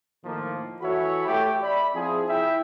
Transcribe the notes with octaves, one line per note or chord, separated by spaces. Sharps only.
A2 D#3 F3 A#3
E3 F#4 A4 C#5 E5 B5
A3 G4
D5 E5 B5
F3 C4 E4 G#4
E4 E5 G5